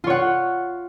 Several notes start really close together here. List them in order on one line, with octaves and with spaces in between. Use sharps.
F4 C#5 F#5